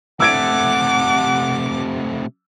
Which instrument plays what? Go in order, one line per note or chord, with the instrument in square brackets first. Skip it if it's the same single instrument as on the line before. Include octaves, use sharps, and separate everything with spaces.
[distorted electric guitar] C3 A3 [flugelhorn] F#5 [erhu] D6 [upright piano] E6 G#6 D7